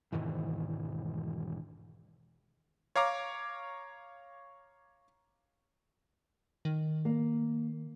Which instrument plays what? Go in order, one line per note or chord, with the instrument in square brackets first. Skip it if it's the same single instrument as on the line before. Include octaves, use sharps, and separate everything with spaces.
[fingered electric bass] E1 G#2 D#3 E3
[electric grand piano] C#5 F5 A#5 D6
[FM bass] D#3
[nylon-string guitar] A#3